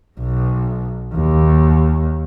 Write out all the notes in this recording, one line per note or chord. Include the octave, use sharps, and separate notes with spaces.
B1
D#2